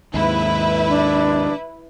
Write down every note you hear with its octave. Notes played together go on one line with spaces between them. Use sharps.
D#2 G#2 E4 B4
D4